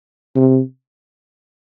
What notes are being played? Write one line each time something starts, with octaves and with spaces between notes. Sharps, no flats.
C3